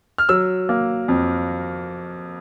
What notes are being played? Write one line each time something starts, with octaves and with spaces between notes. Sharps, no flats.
F6
F#3 E6
A#3
F2